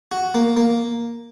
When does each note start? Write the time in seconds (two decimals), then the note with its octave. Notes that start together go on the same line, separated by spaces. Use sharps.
0.12 F#4
0.34 A#3
0.57 A#3